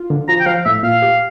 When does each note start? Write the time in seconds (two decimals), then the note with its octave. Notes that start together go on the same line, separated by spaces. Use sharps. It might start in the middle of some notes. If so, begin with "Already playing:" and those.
Already playing: F4
0.10 D3
0.28 F3 A#5
0.40 G5
0.46 F3 F5
0.65 A2 E5
0.83 A#2 F5
1.02 G4